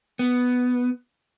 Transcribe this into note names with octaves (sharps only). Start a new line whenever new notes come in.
B3